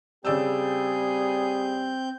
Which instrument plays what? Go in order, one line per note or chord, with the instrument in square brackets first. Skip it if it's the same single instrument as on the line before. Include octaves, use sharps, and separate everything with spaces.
[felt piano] C#3 D5 E6 [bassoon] G3 [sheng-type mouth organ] C4 G6 [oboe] G#4